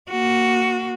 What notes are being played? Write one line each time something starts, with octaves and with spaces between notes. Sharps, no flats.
A#3 F#4